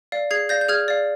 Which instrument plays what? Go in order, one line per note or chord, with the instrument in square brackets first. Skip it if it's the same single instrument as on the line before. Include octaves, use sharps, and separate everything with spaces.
[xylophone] D5 F5
G#4 G#6 C7
D5 F5 G6 A#6
G6
G#4 F6 G#6
D5 F5